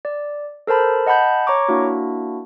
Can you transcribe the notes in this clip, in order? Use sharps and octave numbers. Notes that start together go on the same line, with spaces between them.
D5
A4 A#4 C5 A5 B5
D#5 F#5 A5 B5 G6
C#5 A#5 C#6 D6
A#3 D4 E4 F#4